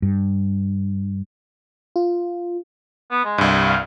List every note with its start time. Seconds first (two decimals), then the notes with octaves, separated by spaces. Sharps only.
0.02 G2
1.96 F4
3.11 B3
3.25 G#3
3.38 C2 G2
3.66 F5